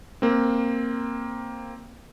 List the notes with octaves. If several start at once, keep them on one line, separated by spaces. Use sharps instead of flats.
A#3 C4